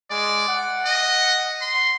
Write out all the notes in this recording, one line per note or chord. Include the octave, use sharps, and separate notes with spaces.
G#3 D5
F#5
D#5
C6